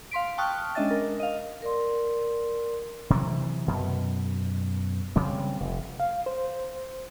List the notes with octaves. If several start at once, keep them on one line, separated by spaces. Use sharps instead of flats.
F5 C6 B6 D7
G5 A5 C#6 D#6 F6 F#6
G#3 C#4 D4 D#5 E5 A6
A#4
D#5 F5
A#4 D5 C6
C3 E3 F#3
F#2 B2
C#3 G3 C4
F1
F5
C5